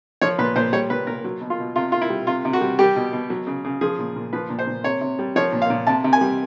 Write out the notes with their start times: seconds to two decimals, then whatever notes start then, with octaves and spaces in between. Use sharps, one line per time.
0.21 F3 C#5
0.38 A#2 B4
0.56 A#2 C5
0.73 G3 C#5
0.90 A#2 B4
1.07 A#2 A#4
1.24 F#3
1.41 B2
1.50 F4
1.59 B2
1.76 C3 F4
1.92 C3 F4
2.02 E4
2.10 G3
2.27 C3 F4
2.45 C3
2.53 F#4
2.61 G3
2.79 G3 G4
2.96 B2
3.13 B2
3.30 F#3
3.47 C#3
3.65 C#3
3.81 F3 G#4
3.99 A#2
4.16 A#2
4.33 F3 B4
4.50 A#2
4.59 C5
4.67 A#2
4.84 C3 C#5
5.01 C3
5.19 G3
5.36 F3 C#5
5.53 A#2
5.62 F5
5.70 A#2
5.87 C3 A5
6.04 C3
6.13 G#5
6.21 G3